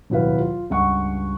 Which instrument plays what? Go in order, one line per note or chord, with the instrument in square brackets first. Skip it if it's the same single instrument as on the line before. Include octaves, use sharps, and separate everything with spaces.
[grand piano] D1 D#2 B2 E4 B4 F5
F4
C#2 G2 D#5 F#5 C#6